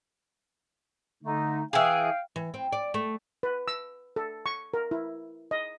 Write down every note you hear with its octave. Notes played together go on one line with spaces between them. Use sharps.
D3 A3 D#4
E3 G#4 F5 G5
E3
C4
D5
A3
B4
E6
A4
C#6
A#4
E4
D#5